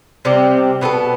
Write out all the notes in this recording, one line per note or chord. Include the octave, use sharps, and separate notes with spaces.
C3 G3 C4 G4
B2 B3 E4 A4